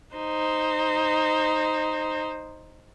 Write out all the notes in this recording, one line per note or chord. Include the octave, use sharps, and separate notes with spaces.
D#4 C5